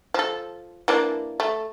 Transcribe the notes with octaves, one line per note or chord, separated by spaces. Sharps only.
F3 A4
E3 A#3 D4
A3